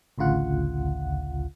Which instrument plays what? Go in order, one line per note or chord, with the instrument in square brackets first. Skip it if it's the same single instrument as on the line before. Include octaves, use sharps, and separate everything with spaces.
[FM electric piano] A1 D2 C#3 F4 F#5